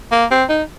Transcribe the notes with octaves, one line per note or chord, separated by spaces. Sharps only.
A#3
C4
D#4